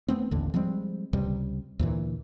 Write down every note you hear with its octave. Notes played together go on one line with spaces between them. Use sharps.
A3 B3 C4
A1 D#2 D3
F3 G3 G#3 C4
C#2 C3 G3
D2 A#2 E3